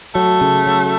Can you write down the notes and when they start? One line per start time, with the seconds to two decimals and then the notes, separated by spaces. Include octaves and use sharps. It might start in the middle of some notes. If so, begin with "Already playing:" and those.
0.14 F#3 A3
0.41 C#3
0.67 F#3